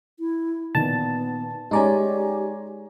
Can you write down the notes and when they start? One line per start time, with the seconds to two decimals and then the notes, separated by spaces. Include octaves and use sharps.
0.20 E4
0.75 A#2 D#3 B3 A5
1.71 G#3 C#4 D#4 G4 D5 G#5 A#5 C6